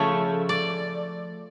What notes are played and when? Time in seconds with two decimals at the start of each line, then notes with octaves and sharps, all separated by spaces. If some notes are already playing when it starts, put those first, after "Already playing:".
Already playing: C#3 F3 A3 C#5
0.49 D5